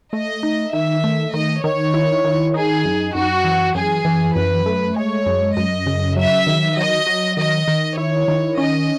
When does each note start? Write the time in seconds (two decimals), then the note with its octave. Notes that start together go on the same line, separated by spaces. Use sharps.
0.13 A3 D#5
0.43 D#4
0.73 D#3 E5
1.04 A3
1.33 D#3 D#5
1.63 D#3 C#5
1.94 E4
2.24 D#3
2.54 D#4 G#4
2.85 F#2
3.15 F#2 F#4
3.44 E3
3.75 F#2 G#4
4.05 E3
4.36 F#2 B4
4.66 A3
4.96 G#3 C#5
5.26 F#2
5.56 F#2 D#5
5.87 C#3
6.16 F#3 E5
6.47 D#3
6.76 F#3 D#5
7.07 F#3
7.37 D#3 D#5
7.68 D#3
7.97 E4 C#5
8.28 D#3
8.58 C#4 D#5